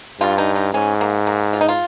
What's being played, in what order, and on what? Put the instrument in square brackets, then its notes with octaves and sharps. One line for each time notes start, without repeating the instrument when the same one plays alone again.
[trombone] G2 [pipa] F4
[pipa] D#4
D#4
[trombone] G#2 [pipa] C#4
[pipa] A#3
A#3
F4
D#4
F4